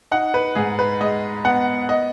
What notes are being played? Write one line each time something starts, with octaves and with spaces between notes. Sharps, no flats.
D#4 F#5
B4
G#2 G#4
B4
G#3 D#5
B3 F#5
D#5